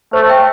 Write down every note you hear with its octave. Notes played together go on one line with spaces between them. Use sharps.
A3 C5
E5 G5